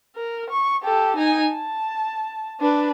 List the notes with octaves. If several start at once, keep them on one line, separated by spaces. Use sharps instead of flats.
A#4
C#6
G4 A4
D#4 G#5
A5
D4 B4